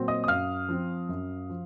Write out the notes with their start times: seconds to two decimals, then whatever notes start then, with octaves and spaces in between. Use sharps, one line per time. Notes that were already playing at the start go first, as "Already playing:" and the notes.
Already playing: A#2 F#3 C4
0.08 D#5 D#6
0.24 D#6
0.28 F#2 F5 F6
0.69 F3 C4
1.09 F#2
1.50 F3